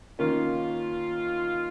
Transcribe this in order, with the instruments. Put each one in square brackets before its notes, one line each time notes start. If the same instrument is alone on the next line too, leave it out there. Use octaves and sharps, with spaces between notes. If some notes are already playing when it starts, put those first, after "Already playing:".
[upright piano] D#3 A#3 C#4 [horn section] F4